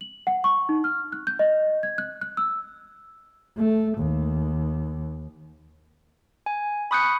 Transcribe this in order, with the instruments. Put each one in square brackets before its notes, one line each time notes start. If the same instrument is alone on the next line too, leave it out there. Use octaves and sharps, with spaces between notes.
[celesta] F#7
F#5
C#6
D#4
F6
F#6
G6
D#5
G#6
F#6
F#6
E6
[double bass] A3
D#2
[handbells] G#5
B5 C#6 D#6 F#6 G6 C#7